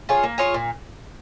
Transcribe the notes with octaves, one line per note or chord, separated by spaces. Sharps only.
F4 G#4 C#5
A#3
F4 G#4 C#5
A#2